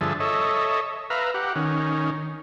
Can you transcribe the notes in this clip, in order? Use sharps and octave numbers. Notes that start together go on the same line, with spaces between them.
G2 D3 F3 G#4 E5 A5
A4 C#5 D#5 E5
B4 E5 F5 A#5
G4 F#5
D#3 C#4